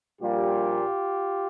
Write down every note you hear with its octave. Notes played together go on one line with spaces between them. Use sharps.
A#1 A#2 G3 A#3 F4 G4